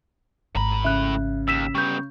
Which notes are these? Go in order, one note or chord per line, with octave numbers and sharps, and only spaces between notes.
G#1 A2 A#5 B5
C#3 E5 F#6
D#2 E6 B6 E7
G3 B3 C#6 G6